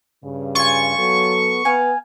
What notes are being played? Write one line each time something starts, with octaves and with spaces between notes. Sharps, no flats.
G2 C#3
F4 G#5 C#6
F#3 B3 A4
B3 F5 G#5